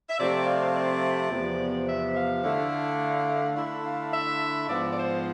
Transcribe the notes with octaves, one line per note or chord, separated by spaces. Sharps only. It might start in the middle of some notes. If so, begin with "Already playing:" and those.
E5
C3 F3 A3 C4 D5
F5
D5
E2 C3 F3 B3
E5
F5
D3 A3 E4
D3 A3 E4 E5
F5
E5
G#2 F3 B3 F4 D5
D5
C5